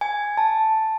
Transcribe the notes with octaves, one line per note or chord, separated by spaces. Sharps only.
G#5
A5